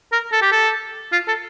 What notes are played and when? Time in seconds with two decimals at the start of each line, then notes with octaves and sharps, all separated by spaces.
0.12 A#4
0.32 A4
0.42 G4
0.52 A4
1.12 F4
1.28 A4